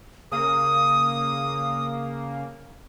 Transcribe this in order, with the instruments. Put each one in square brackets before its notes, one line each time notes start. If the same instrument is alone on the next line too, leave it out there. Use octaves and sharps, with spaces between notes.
[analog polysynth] C#3 A#3 [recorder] D#6